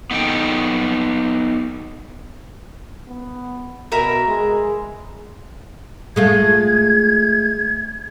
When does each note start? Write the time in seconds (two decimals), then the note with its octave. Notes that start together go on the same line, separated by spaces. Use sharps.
0.11 B3 D#4 A4 G5
3.08 B3
3.92 B2 A#4 E5 B5
4.28 G#3
6.16 G#3 A3 F4 G#6